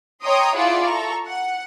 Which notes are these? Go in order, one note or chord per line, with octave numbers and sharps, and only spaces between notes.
C#5 D#5 G5 A#5 C6 D#6
E4 F4 G#4 D5 E5 F#5
A4 A#5 C#6
F#5